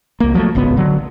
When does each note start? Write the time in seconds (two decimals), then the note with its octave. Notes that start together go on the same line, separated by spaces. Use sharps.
0.20 C2 A#3
0.34 F3 F#3 G#3 A3
0.55 D1 G#1 C#2 B3
0.77 D3 F#3